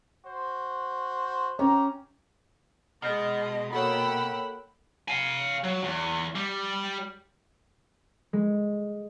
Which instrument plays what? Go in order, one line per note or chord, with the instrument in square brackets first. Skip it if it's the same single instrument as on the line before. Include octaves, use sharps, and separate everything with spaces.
[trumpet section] F#4 C5
[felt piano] C#4 [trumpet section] G4 A#5
[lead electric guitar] B2 [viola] G#3 D#5 [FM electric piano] F6 G6
[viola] A#3 B5 [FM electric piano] F#4 A4 C#5 [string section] F#5 G5 E6
[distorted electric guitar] F5 G#5
F#3
E2
G3
[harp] G#3